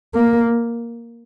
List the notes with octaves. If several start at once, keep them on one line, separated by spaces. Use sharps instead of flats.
A#3